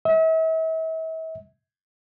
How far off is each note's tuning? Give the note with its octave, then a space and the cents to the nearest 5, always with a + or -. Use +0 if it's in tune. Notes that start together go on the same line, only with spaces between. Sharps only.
E5 -40